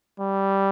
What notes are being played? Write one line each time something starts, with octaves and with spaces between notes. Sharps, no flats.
G3